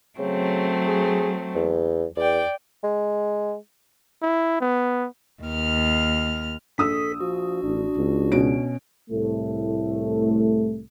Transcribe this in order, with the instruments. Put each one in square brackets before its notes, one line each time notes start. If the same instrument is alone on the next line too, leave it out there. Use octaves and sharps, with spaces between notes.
[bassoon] C#3 [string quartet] F#3 A3 C4
[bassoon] G#4
E2
[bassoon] E2 [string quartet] D5 G5
[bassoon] G#3
[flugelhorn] E4
B3
[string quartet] D#2 F6
[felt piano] A#1 D#6 E6 [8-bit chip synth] A4 B6
[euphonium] F3 [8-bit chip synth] F#4
[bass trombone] A1 [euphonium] D4
[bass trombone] C#2
[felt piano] B2 C#4 D7
[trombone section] C2 A2 A3